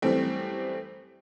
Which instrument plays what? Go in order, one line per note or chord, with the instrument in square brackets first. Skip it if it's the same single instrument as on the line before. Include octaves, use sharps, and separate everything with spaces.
[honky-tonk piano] F#2 E3 G3 A3 C4